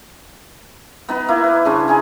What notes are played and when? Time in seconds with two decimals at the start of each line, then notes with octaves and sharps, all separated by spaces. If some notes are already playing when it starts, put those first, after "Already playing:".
1.09 B3 D#4 B4
1.29 A#3 E4
1.44 B4
1.65 C#3 D4 C5 C#6
1.88 D#4 G#4 G#5